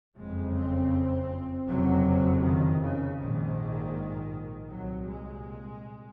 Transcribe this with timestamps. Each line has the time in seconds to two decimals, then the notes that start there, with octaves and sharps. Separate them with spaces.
0.16 F#1 F2 C#3 G#3
0.55 C4
1.67 F#1 F2 C3 F#3
2.43 D#3
2.81 C#3
3.18 A#1 G#2 D#3
4.69 C2 A#2 F#3
5.07 G#3